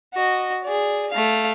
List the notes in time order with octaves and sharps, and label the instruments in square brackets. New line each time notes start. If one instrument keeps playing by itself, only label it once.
[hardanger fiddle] F#4 D#5
G#4 D5
A3 F5